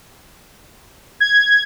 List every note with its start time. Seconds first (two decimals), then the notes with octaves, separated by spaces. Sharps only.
1.20 G#6